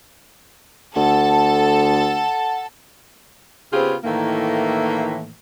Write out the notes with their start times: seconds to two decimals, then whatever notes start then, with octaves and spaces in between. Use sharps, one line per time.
0.96 D2 A4 F#5 A5
3.73 C#3 B3 C4 F4 G4 G#4
4.04 A2 D#3 E3 A3 A#3